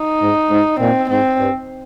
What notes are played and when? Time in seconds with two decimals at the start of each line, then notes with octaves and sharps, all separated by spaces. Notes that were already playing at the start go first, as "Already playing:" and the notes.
Already playing: D#4
0.21 G#2
0.51 G#2
0.80 A#2 C4
1.10 G#2 C4
1.39 G2